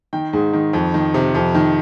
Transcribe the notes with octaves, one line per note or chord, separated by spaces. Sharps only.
D#3 G5
G#2
D#3
F2
D#3
C3
F2
D#3